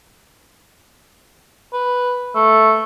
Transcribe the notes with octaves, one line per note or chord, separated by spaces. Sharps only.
B4
A3